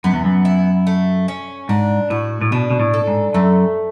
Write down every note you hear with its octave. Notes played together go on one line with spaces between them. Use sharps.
F#2 B3
E2
F#2
E4
A3
C#4
G#2 D4
A2 F#4
A2
B2 D4
B2
A2
A4
G#2
F#2 A3